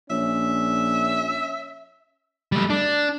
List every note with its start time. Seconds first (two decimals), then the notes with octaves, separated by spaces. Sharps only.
0.10 A#1 C#4 E5
2.52 G3 A3
2.70 D4